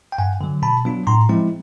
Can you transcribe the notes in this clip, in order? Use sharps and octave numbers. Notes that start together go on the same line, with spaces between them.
G5
G2 F#5 G#5
D3 F#3
B2 A5 B5
F#3 B3 D4 F4
A2 A#5 C6
F3 G#3 C4 E4